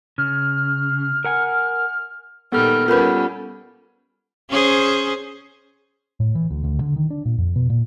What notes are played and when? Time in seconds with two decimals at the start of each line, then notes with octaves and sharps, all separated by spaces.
0.18 C#3 F6
1.24 A#4 F#5 G#5
2.52 A#2 D#3 G3 B3 A4 F6
2.88 G3 C#4 F4 A#4 B4 F#5 B5
4.50 C#4 G#4 C5
6.20 A2
6.35 E3
6.51 D2
6.64 D2
6.81 D3
6.96 D#3
7.10 D4
7.26 A#2
7.38 F2
7.56 B2
7.70 A#2